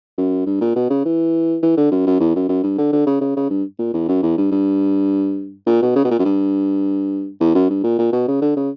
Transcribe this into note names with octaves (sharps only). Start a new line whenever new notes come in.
F#2
G2
A#2
B2
C#3
E3
E3
D3
F#2
F#2
E2
F#2
F#2
G2
D3
D3
C#3
C#3
C#3
G2
A#2
E2
F#2
E2
G2
G2
A#2
B2
C#3
B2
A#2
F#2
G2
E2
F#2
G2
A#2
A#2
B2
C#3
D3
C#3